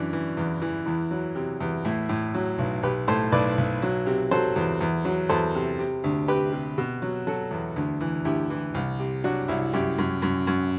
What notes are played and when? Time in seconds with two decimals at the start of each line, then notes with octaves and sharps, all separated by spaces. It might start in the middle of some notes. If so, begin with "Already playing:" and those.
Already playing: F#2 E3 D4
0.13 E3
0.37 E2
0.62 E3
0.86 E2 E4
1.11 F#3
1.35 C3
1.61 E2
1.85 A2 E4
2.09 A2
2.34 F#3
2.58 B1
2.83 B1 G4 B4
3.08 A2 A4 C5
3.32 B1 B4 D5
3.58 B1
3.82 F#3
4.06 C3
4.31 F#3 A4 C5
4.56 E2
4.81 E2
5.05 F#3
5.29 E2 A4 C5
5.55 C3
5.79 C3
6.04 D2
6.28 C3 G4 B4
6.52 C3
6.78 B2
7.02 F#3
7.27 F#3 F#4 A4
7.51 E2
7.76 D2
8.01 E3
8.25 D2 E4 G4
8.50 E3
8.74 C2
8.99 C3
9.24 F#3 D4 F#4
9.48 C2 E4
9.73 F#2 E4 G4
9.98 F#2
10.22 F#2
10.47 F#2